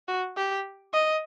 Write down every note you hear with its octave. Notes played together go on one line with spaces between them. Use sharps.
F#4
G4
D#5